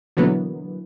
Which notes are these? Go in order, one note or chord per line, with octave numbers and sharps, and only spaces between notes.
B2 D3 E3 F#3 A#3 B3